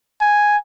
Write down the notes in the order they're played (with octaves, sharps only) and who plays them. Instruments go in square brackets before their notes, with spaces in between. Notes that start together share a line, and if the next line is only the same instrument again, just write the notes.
[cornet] G#5